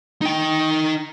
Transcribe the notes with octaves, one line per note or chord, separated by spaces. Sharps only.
D#4 G5